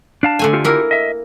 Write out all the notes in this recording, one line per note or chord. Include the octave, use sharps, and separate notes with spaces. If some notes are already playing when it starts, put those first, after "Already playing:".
D4 F5 A5
D3 A3 G#5
F4 G4 A4
A#3 E4 A#4
D#5 E5